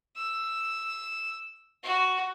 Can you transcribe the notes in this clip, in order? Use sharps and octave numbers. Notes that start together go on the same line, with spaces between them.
E6
F#4